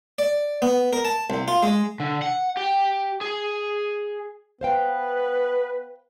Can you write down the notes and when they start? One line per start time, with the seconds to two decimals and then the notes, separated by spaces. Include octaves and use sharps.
0.18 D5
0.62 B3
0.93 A#4
1.05 A5
1.30 C2
1.48 F4
1.63 G#3
2.00 D3
2.22 F#5
2.57 G4
3.21 G#4
4.61 B3 B4 C5 F5 G5